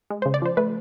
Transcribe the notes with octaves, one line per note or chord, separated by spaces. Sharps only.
G#3
C#3 C5
D5
F3 C5
A3 B4